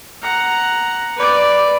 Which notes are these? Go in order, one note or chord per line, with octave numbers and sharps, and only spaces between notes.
F#5 A#5
B4 D5